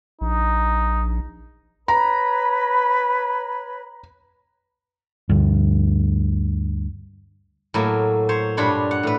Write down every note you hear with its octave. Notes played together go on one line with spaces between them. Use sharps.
A#1 D#4
B4 C#5 A#5 B5
D2 G2
A2 F#3 A#3
C5 C#5
G2 A#2 D4 C#5 B5 C6
F#5
A2 B4